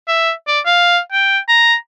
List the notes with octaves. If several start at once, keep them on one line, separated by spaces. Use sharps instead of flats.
E5
D5
F5
G5
A#5